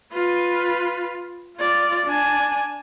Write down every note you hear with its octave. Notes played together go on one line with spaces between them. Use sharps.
F4 B4
F4 D5
D4 G#5